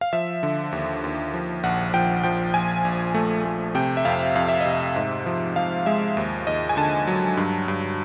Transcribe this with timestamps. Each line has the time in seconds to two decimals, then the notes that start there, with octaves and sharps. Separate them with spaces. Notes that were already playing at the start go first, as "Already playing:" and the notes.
0.01 F5
0.13 F3 E5
0.43 D3
0.72 D#2
1.04 D#2
1.34 F3
1.63 A#1 F#5
1.94 F3 G5
2.24 F3 G5
2.54 A#1 G#5
2.85 A#1
3.14 A3
3.45 A3
3.75 C3 G5
3.97 E5
4.05 F2 F5
4.35 F2 F5
4.48 E5
4.61 C3 D#5
4.73 E5
4.96 G#2
5.26 F3
5.56 F3 F5
5.86 G#3 E5
6.17 D#2
6.47 D#2 D#5
6.69 G#5
6.77 D3 A5
7.07 F#3
7.37 G2
7.68 G2